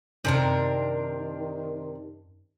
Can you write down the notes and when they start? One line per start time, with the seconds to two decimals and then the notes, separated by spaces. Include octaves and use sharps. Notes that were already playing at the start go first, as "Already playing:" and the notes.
0.25 F#2 C3 D#3 D4 A#4